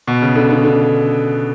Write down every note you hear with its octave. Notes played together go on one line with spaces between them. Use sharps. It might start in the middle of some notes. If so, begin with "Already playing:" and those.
B2
C#3
D3
D3
D3